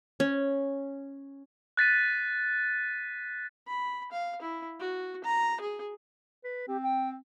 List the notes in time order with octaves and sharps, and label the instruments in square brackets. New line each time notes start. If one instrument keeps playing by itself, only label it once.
[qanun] C#4
[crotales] F#6 A6 B6 D#7
[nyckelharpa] B5
F5
E4
F#4
A#5
G#4
[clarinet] B4
[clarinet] C4 [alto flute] G4
[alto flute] G5